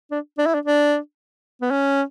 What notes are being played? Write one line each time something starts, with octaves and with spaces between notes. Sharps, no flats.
D4
D4
E4
D4
D4
B3
C#4